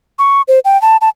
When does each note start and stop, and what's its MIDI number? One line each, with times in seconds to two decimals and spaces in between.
0.19 0.42 85
0.48 0.59 72
0.65 0.80 79
0.82 0.97 81
1.01 1.09 81